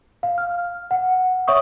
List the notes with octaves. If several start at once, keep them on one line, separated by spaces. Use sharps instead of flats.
F5
F6
F#5
C#5 E5 C#6 D#6